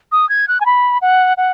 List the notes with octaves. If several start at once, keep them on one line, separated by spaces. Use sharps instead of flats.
D#6
G#6
F#6
G#5
B5
F#5
F#5